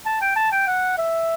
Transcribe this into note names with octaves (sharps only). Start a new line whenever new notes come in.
A5
G5
A5
G5
F#5
E5